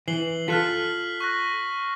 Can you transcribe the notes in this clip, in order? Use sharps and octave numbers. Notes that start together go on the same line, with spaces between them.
E3 C7 F#7 G7
F4 A4 F6 F#6 B6
C#6 F#6 A#6